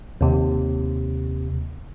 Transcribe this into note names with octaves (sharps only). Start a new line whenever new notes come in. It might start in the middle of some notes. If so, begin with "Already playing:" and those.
D#2 C3